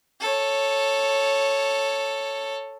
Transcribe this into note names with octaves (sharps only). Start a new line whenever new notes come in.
A4 C#5